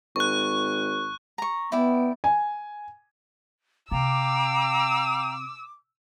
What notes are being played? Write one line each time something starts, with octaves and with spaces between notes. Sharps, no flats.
G#1 C#6 F#6
A#5 C#6
B3 E4 D5 G5
G#5
C3 F5 G5 A#5 D6 E6